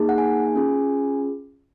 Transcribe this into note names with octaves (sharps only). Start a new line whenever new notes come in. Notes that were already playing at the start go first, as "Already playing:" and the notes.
Already playing: A#3 D#4 G#4
F#5
G#5
C#4 F4 G#4